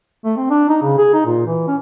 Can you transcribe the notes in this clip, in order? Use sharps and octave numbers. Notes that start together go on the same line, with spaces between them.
A3
C4
D4
D#4
C#3
G#4
D#4
A#2
E3
C#4